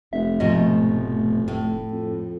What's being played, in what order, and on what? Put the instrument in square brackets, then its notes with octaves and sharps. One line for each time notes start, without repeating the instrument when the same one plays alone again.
[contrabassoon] F1 [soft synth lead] E5
[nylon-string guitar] G#2 B2 F3 [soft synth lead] D#5
[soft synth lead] A3
[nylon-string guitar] A2
[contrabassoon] F2